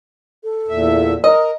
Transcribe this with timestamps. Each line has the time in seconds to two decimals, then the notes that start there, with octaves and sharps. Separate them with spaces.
0.44 A4
0.68 E2 A#2 E5
1.24 A#4 D#5